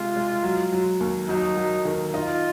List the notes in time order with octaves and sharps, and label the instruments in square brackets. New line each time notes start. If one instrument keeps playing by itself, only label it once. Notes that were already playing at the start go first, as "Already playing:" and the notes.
Already playing: [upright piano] C3 G#3 [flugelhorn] F4
[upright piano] G#3
F#3
F#3
D#2
[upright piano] F#3 [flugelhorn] D#4
[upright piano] F#3
D#3
[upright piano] D#4 [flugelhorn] F4